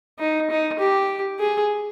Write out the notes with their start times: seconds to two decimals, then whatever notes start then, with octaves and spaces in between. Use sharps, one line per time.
0.19 D#4
0.50 D#4
0.79 G4
1.39 G#4